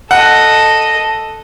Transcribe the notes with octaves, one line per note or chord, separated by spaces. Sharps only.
A4 D#5 F#5